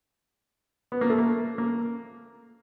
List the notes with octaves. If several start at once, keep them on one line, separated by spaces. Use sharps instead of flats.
B3
A#3
A3
A#3
A#3